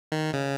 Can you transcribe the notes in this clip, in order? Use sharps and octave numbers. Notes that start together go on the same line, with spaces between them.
D#3
C#3